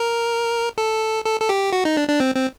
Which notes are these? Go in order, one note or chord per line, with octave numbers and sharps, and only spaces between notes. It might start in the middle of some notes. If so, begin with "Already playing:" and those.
Already playing: A#4
A4
A4
A4
G4
F#4
D#4
D4
D4
C4
C4